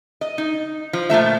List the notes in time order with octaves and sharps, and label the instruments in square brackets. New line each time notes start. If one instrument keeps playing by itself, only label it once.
[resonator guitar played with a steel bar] D#5
D#4
F3
A#2 F3 A3 E5